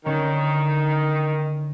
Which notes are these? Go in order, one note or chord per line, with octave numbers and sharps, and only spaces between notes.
D3 D#3 C#4